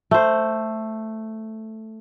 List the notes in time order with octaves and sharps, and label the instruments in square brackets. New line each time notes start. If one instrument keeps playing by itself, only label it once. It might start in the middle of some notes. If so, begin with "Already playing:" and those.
[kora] A3 C5